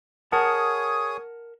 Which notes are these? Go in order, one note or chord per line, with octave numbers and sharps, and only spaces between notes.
G#4 A#4 C#5 F#5 A5 D#6